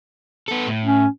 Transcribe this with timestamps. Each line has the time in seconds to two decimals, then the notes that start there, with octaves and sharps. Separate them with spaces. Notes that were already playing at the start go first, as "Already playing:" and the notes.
0.48 B3 A4
0.67 A2
0.85 C#4